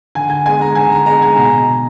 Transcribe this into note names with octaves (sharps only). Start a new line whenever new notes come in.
D3 G#5
G#5
G#3 B3 G#5
A#5
D3 G#5
A#5
G#3 B3 A#5
G#5
B2 A#5